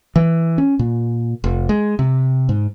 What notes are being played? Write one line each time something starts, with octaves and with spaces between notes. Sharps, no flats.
E3
C#4
A#2
F1
G#3
C3
G#2